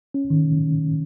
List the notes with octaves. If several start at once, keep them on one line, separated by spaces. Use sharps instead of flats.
C#4
D#3